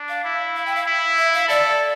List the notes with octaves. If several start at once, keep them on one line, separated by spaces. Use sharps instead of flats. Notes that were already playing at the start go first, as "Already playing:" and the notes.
Already playing: D4
F5
E4
F5
G5
F5
E4
E5
F5
A4 D5